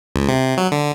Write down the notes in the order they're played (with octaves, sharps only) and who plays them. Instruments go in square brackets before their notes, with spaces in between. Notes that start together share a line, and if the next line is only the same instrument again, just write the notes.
[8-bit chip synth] C#2
C3
F#3
D3